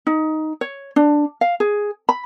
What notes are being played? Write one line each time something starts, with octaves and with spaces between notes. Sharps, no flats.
D#4
C#5
D4
F5
G#4
B5